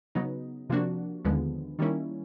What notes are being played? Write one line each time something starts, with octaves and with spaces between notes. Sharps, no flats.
C#3 F#3 B3 D#4
C3 F3 A#3 D4 F#4
D#2 D3 F3 G#3 B3
D#3 G3 A#3 C#4 E4